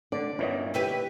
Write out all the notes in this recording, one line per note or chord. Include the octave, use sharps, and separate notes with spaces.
D3 D5
G1 A#2 E3 C#4 C#5 D#5
E4 G4 B4